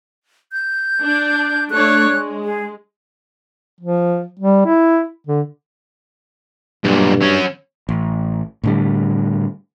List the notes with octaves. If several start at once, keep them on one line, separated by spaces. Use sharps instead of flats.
G6
D4
A3 D4 C#5 F#6
G#3
G#4
F3
G3
E4
D3
B1 G2 A#2
F#3 C#4
A1
A2 D3 G3